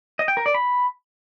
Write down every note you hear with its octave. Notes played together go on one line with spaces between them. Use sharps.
D#5
G5
A#4
D5
B5